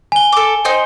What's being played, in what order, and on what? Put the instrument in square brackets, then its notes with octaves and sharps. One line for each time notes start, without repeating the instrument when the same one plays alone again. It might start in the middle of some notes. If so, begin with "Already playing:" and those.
[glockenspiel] G#5 G7
[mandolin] A4 D6
D#4 C5 G5